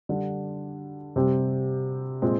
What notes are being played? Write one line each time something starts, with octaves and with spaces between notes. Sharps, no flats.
D3 G3 D4
C3 G3 C4 G4
A#2 G#3 C4